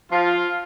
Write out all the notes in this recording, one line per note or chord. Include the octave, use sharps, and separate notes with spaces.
F3 F4